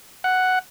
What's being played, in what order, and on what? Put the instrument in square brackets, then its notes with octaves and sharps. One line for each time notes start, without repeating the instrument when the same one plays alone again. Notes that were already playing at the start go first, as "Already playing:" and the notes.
[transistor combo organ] F#5